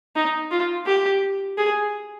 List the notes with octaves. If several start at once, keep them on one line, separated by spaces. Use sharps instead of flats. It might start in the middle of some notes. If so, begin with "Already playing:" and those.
D#4
F4
G4
G#4